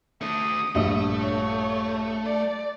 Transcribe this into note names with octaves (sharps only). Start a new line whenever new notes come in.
A3 D4 D#6
A#1 G2 A3
C#5
D5